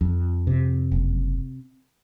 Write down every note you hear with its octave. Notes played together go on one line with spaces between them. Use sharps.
F2
C3
F#1